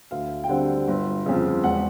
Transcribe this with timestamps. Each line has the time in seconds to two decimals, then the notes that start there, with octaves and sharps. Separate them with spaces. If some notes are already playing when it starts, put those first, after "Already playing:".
0.11 D2 F5
0.44 G5
0.49 D3 G3 C4 F#5
0.88 G1
1.26 F2 C#3
1.64 E1 F#5